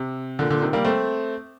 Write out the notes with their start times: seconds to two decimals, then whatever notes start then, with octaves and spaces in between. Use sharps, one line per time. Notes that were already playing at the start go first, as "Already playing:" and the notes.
Already playing: C3
0.39 A#2 D3
0.50 A#2 D3
0.62 C3 D#3
0.73 G3 A#3
0.84 A3 C4